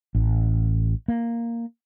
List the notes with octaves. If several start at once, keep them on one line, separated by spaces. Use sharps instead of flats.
A1
A#3